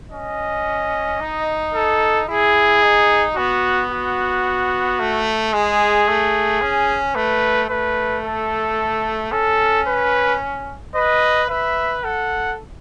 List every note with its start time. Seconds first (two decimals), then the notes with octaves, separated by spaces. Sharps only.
0.11 C#4 D#5
1.20 D#4
1.74 A4
2.28 E4 G#4
2.82 D#4
3.36 B3 F#4
3.91 F#4
4.99 A3
5.53 G#3 G#4
6.08 A3
6.61 C#4
7.16 A3 B4
7.70 A3 B4
8.25 A4
9.32 C#4 A4
9.87 B4
10.95 B4 D#5
11.49 B4 E5
12.04 A4 F#5